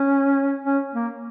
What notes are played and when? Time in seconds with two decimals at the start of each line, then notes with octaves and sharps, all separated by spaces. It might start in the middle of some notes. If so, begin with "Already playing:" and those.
Already playing: C#4
0.65 C#4
0.94 A#3